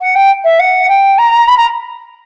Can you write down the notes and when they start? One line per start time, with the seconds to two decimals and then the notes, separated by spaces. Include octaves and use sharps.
0.01 F#5
0.15 G5
0.44 E5
0.59 F#5
0.89 G5
1.18 A#5
1.47 B5
1.57 A#5